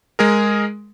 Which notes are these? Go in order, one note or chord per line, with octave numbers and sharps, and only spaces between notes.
G#3 G#4 A#4